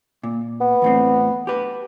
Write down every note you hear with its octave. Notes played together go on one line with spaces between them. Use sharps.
A#2
B3
E2 A2 C4
G4 B4